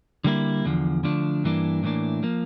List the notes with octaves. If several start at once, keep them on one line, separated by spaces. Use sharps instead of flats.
D3 G3 A#3 E4
E2 D3 F3
D3 F3 A3 D4
G2 E3 A#3 D4
A2 E3 A#3 D4
F3 A#3